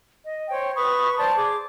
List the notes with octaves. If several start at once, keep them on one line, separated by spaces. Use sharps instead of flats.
D#5
C5 C#5 G5
B4 B5 C#6 D#6
C5 D5 A5
G#4 D6